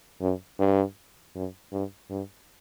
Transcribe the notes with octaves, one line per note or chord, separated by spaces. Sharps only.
F#2
G2
F#2
G2
G2